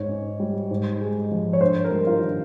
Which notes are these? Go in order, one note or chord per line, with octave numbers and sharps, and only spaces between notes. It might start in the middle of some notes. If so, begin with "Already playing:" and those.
Already playing: G#2 C#5
C#4
G3
G#2
G#3
F3
C#5
G2 C5
A#4
G3
F4
D#3